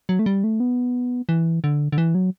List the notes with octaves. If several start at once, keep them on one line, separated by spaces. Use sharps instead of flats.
F#3
A3
G3
A3
B3
E3
D3
D3
E3
F#3